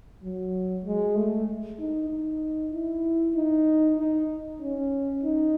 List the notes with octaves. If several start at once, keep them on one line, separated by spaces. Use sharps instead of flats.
F#3
G#3
A3
D#4
D#4
E4
D#4
D#4
C#4
D#4